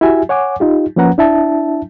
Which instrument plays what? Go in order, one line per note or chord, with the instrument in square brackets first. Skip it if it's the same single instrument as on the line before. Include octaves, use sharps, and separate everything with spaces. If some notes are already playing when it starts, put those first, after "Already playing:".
[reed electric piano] E4 F#4 G4 E5 G#5
C#5 F#5 G#5 D6
D#4 F4 G4
F3 A#3 C#4 B4 F#5 A#5
D4 E4 E5 A5